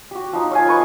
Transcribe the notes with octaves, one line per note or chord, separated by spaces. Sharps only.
F#4 G4
F3 D#4
C#5 F5 G#5
B4 D#5 C#6